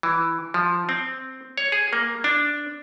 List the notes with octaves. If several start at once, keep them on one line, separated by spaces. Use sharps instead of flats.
E3
F3
C4
C#5
G#4
A#3
D4